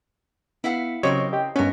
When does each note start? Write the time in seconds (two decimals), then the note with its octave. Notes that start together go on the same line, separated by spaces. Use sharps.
0.64 B3 E4 F5 F#5 B6
1.03 C#3 F#3 C4 G4 A#4 C5 C#5 D#5
1.33 G4 D#5 G5
1.56 G2 B3 C#4 A#4